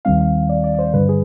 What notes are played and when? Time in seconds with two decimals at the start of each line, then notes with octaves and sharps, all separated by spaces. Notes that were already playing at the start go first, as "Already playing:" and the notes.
0.05 D#2 D#3 G3 C4 F5
0.20 F5
0.49 D5
0.64 D5
0.74 D5
0.79 C5
0.93 G2 D3 G3 B4
1.09 G#4